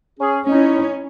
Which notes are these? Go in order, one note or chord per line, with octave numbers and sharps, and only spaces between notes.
C#4 G#4
C#4 D#4 E4